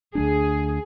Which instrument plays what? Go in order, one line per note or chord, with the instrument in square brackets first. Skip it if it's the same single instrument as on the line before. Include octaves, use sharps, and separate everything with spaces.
[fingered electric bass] D2 A3 D4 [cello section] G#4